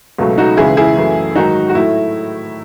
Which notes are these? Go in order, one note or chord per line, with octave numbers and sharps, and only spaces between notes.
C#2 B2 F#3 A3
D#4 F#4
C#2 C#3 E3 E4 G#4
E4 G#4
F#2 E3 A3
G#2 D#3 F#3 D#4 F#4
F#4
A2 F#3 A3 E4